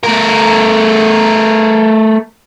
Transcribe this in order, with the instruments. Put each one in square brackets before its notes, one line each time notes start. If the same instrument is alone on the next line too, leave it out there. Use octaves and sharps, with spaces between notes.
[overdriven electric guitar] A3 A#4